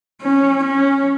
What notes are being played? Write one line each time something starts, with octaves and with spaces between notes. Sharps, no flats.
C#4
C#4